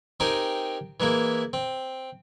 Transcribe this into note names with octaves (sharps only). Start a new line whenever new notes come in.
C4 D#4 G4 A#4 G#5
E3 G#3 A#3 E4
C4